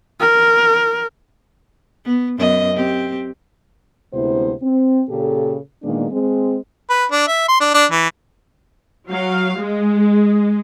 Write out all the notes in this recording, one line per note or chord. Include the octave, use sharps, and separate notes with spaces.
A#4
B3
F#2 B3 D#5
C4 G4
D2 C3 G#3 B3 E4 C5
C4
A#2 C#3 G4 A4
A#2 D#3 G#3 A#3 B3 D4
G#3 C4
B4
D4
E5
C6
D4
D4
E3
F#3 F5
G#3